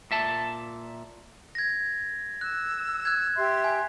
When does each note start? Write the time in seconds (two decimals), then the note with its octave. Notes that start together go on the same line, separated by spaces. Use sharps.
0.11 A#2 E5 A5
1.55 G#6 A#6
2.41 E6 F#6
3.05 F#6 G#6
3.36 G4 E5 C6
3.64 G#5